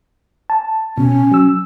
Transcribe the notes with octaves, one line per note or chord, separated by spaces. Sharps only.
A5
B2 C#4
F#3 E6